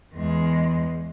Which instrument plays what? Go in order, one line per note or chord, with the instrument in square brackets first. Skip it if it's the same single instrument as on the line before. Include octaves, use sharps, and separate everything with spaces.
[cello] E2 G#3